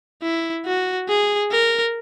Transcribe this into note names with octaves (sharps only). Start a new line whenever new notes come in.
E4
F#4
G#4
A#4